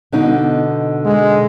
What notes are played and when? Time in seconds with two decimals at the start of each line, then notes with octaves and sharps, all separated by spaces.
0.12 B2 D3 D#4
1.05 G#3